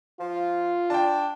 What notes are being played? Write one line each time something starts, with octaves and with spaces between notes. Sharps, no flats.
F3 F4
D4 G5 A5